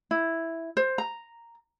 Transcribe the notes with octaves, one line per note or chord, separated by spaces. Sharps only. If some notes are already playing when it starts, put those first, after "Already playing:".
E4
C5
A#5